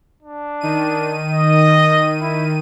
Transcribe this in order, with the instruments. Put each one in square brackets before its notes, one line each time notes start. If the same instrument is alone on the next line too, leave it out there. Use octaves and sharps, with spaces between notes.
[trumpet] D4
[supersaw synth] D#3 D#7
[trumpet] D#5
E4